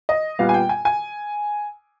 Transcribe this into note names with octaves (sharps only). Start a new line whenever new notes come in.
D#5
A#2 G3 B3 F5
G#5
G5
G#5
G#5